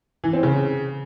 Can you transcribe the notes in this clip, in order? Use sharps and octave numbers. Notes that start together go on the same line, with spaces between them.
E3
C4
C#3